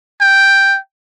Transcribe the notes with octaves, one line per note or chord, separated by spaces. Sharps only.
G5